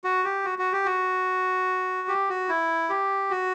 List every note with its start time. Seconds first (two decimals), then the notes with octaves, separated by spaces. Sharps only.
0.04 F#4
0.24 G4
0.45 F#4
0.59 F#4
0.73 G4
0.85 F#4
2.08 G4
2.29 F#4
2.49 E4
2.90 G4
3.31 F#4